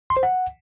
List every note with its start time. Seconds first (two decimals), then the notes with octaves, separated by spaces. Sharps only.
0.10 C6
0.17 C5
0.23 F#5